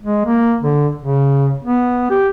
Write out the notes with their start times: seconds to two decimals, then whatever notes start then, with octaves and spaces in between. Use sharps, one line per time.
0.03 G#3
0.26 A#3
0.63 D3
1.01 C#3
1.63 B3
2.11 G4